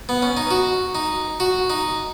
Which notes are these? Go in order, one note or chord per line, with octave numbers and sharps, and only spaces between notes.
B3
C#4
D#4
F#4
D#4
F#4
D#4